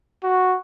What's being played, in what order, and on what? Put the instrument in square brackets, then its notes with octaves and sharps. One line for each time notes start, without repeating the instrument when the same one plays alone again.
[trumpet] F#4